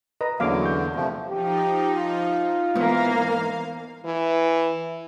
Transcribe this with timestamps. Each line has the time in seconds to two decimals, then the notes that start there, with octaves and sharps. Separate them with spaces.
0.21 B4 D#5 A#5 A#6
0.40 E2 D3 F#3 A#3 C#4 F5 D6
0.62 C#6 G6
0.95 C3 F3 A3
1.29 F3 D#4 G4
1.96 F4
2.75 G#2 E3 A#3 B3 F5
4.05 E3